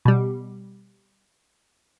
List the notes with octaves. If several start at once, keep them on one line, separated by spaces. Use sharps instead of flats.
B2 G3